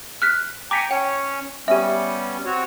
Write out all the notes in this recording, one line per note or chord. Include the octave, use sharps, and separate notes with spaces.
F6 F#6 B6
G5 G#5 A#5 D6 B6 C#7
C#4 C#5 G5
G3 B3 C#4 G4 E5
C4 F#4 C#5